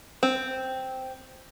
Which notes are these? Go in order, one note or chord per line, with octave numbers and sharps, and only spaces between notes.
C4